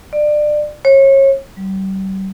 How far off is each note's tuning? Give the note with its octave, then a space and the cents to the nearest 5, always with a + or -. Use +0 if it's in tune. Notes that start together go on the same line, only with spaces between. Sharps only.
D5 +25
C#5 -30
G3 -35